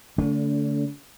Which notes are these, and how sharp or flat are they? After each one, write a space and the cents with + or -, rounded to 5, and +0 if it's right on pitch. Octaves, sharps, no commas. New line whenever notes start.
D3 -25 A3 +0 D4 -45